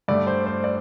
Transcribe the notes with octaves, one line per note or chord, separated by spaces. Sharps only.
G2 D3 A3 D5
C5
C5
D5